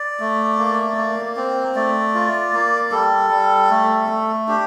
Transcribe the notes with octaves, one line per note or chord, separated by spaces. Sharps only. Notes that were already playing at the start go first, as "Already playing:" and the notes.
Already playing: D5
A3
A#3
A#3
C4
A3 D5
F4
A#3
G3 A4
G3
A3
A3
D4 G4